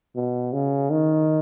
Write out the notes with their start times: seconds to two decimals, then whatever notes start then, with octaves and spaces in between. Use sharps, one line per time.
0.16 B2
0.53 C#3
0.90 D#3